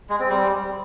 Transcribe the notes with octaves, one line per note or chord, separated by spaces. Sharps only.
G#3
C4
G3